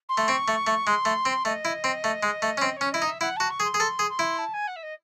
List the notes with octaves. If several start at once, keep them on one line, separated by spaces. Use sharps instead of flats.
C6
A3
C4 C#6
A3
A3
G#3 C6
A3
C4
A3 D#5
E4
C4
A3
G#3
A3
C#4
C4 D#5
C#4 C#5
E4 D#5
D#4
E5
E4 F#5
F#4 A5
C#6
G#4
C6
G#4
A4 C6
G#4
C6
E4
A5
G#5
F#5
E5
D#5